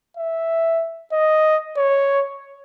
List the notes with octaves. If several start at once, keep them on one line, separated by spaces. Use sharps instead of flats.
E5
D#5
C#5